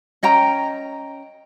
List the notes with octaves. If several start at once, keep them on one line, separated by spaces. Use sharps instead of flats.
C#4 D#5 G5 A#5